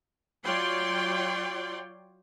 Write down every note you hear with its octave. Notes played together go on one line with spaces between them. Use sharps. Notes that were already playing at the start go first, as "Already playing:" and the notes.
F#3 F4 C#5 D5 G5 C6